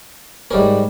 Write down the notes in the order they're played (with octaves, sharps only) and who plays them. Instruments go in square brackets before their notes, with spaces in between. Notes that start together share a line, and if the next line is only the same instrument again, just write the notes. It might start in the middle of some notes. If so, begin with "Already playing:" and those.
[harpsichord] G#2 G3 C#4 A#4